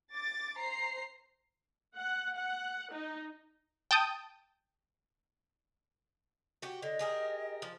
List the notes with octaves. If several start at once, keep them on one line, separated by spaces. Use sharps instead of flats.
D6 A6
C5 A#5 C7
F#5
F#5
D#4
G5 A5 D#6 G6
F#4 G4
D3 D#5
G4 G#4 A#4
F3